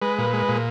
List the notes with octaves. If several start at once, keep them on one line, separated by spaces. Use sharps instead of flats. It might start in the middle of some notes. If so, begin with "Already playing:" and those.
G#3 B4
A#2
G#3
A#2